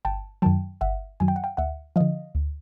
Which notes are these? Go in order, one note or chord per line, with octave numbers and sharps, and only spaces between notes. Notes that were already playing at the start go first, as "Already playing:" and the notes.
G1 G5 A5
F#2 D#3 F#3 G5 A5
G1 E5 F#5
F#2 D#3 F#3 G#5
G5
F#5
F5 G5
D2 E5 F#5
D3 F3 D#5 F5
D2